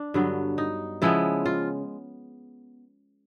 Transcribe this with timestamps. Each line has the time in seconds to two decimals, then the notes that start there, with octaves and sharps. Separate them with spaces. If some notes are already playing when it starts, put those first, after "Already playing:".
Already playing: D4
0.14 G2 D3 F#3 B3
0.58 D#4
1.02 C#3 F3 G#3 B3 E4
1.46 F4